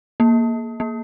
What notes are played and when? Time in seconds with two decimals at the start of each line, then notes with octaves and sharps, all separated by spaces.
0.20 A#3
0.80 A#3